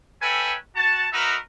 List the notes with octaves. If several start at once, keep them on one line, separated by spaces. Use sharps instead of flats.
C#4 A4 B4 E5 G5 G#5
F#4 A5
D#4 F#4 A#4 B4 D#5 E5